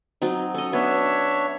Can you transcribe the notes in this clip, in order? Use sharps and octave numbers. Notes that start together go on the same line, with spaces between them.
F#3 C4 D#4
C#4 A4 D#5
B3 D4 C#5 E5